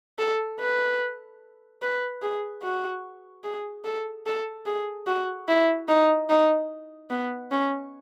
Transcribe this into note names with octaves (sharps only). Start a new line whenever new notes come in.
A4
B4
B4
G#4
F#4
G#4
A4
A4
G#4
F#4
E4
D#4
D#4
B3
C#4